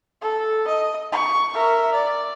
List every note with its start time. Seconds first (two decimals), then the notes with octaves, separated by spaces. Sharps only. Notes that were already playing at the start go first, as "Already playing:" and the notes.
0.22 A4
0.67 D#5
1.13 C#6
1.54 A#4 E5
1.94 D5